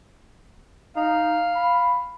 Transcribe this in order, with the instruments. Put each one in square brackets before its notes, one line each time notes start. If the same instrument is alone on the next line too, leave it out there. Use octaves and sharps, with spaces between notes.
[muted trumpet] D#4 [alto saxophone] F5
[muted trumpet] B5